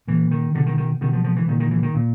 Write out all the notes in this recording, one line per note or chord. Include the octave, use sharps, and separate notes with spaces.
A#2 E3
D#3
B2 D3
D#3
D#3
B2 D#3
F3
F3
E3
A#2 D#3
D#3
E3
D#3
A#2